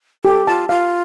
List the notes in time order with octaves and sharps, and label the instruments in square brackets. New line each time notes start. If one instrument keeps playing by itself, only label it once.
[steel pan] G4 [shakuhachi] A4
[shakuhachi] F4 [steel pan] A5
[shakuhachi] F4 [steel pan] F5